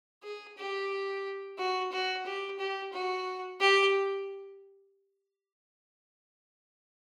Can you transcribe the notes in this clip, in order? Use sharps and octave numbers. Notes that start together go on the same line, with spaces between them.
G#4
G4
F#4
F#4
G4
G4
F#4
G4